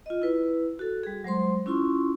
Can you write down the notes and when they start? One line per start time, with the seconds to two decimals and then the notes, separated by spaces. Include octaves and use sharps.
0.06 F4 D#5
0.22 E4 B4
0.79 F#4 A4
1.03 G3 G#4
1.24 F#3 G#3 C5 C6
1.66 C#4 E4 F4 C6 C#6